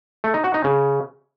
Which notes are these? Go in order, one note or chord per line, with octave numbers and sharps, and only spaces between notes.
A3
D#4
F#4
D#4
C#3